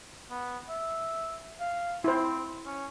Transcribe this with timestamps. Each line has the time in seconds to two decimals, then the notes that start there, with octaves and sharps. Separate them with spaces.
0.31 B3
0.69 E5
1.60 F5
2.04 C4 E4 C5
2.66 C#4